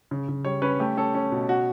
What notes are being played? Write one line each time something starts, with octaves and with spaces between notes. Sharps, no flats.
C#3
C#3
G3 C#5
C#4 B4
A3 G4
C#4 A4
C#4
B2
F#4